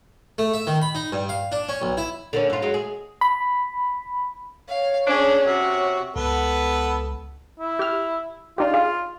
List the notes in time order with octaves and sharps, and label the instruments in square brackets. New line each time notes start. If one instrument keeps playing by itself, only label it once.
[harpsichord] A3
E5
D#3
B5
D#4
G2
F5
D4
C#4
B1
E4
[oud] D3 A#3 C#4
G2 F4
F#3 G#3
G#4
[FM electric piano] B5
[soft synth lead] C#5 [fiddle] F5
[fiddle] C#4 G#4 [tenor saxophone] D4
[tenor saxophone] C3 [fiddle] F#4
[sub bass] C#2 [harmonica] B3 A4 B4
[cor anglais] E4
[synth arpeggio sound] G4 F6
[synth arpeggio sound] D4 D#4 G4 [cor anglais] F4
[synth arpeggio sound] G#4 F5